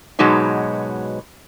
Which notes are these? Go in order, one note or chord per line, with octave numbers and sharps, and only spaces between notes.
G#2 B2 F#3 G#3 B3 D#4